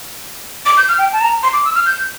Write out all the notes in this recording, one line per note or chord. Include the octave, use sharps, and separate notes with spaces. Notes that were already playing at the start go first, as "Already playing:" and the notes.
D6
G6
F6
G5
A5
A#5
C6
D6
E6
F6
G6